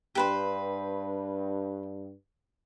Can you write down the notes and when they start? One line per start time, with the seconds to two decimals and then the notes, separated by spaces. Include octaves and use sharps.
0.15 G2 G4 B4 C5